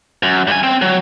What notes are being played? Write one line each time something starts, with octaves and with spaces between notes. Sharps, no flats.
F#2
G2 G#5
C4
F#3